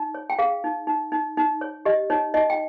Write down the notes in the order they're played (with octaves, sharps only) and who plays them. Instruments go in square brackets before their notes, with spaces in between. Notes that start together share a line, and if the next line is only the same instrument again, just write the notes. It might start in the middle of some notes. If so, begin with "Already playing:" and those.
Already playing: [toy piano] D#4
C#5
G5
G#4 F5
D#4
D#4
D#4
D#4
C#5
G4 D#5
D#4 C#5
D#4 D#5
G5